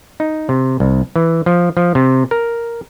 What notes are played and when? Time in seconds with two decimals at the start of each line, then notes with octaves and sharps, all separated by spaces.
0.20 D#4
0.49 C3
0.80 C2
1.16 E3
1.46 F3
1.77 F3
1.95 C3
2.31 A#4